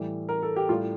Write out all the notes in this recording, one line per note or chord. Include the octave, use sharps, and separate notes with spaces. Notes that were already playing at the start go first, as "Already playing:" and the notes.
Already playing: A2 E3 G3
A#4
A4
G4
A2 G3 F4